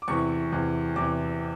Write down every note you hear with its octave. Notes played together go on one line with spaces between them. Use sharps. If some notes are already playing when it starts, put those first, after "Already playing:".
D6
E2 C3 E3 C#6
E2 C3 E3
E2 C3 E3 D6